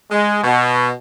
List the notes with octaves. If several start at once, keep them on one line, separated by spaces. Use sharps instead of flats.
G#3
B2